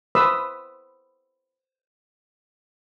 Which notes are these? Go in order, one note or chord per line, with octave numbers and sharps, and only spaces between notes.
B4 C5 B5 C6 D#6 E6